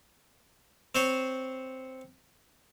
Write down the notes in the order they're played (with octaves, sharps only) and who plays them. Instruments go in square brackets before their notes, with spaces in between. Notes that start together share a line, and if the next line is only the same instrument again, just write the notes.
[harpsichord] C4 C5 C#5